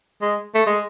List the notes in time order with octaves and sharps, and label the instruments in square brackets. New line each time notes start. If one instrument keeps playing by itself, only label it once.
[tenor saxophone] G#3
A3
G#3